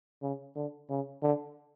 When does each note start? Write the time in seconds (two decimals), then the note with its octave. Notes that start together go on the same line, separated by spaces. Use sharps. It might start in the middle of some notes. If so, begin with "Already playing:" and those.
0.22 C#3
0.56 D3
0.90 C#3
1.22 D3